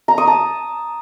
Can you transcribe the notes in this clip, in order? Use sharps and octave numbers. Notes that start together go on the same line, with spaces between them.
A#5
D#6
A5